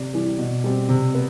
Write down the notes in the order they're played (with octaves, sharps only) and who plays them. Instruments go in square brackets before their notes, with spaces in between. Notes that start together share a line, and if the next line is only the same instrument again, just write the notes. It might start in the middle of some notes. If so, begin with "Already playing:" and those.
Already playing: [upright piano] C3 D5
E3 G3
B2
G3 C4
C3
B3